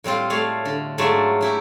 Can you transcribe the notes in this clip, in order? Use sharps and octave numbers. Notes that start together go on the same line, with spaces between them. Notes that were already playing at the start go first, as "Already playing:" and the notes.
A2 G3 C4 F4
A3 C#5 D5 F5
D3
G#2 F#3 A3 F4 D5 E5
F#3 E4 G4